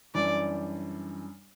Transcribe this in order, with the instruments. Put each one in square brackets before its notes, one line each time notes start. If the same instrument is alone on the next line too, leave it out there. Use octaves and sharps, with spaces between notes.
[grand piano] F#2 E3 G3 D4 [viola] D5